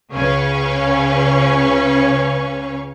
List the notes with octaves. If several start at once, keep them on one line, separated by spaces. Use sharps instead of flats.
C#2 C#3 C#4 B4 F5 C#6